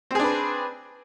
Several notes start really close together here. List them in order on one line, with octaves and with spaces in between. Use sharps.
C4 G#4 D4 B4